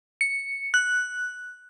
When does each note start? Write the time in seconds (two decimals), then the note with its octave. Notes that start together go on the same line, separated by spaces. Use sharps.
0.21 C#7
0.74 F#6